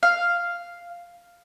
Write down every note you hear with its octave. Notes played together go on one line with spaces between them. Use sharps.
F5